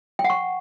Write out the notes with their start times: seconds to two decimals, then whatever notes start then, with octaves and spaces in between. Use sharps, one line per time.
0.19 G5
0.24 F#5
0.30 C#6